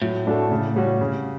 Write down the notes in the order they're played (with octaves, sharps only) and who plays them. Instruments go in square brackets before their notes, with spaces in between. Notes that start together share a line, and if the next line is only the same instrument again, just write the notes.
[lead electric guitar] A2 [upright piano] F#3
[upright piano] A3 D4 F#4 A4
C#3
G3 C#4 F#4
C#3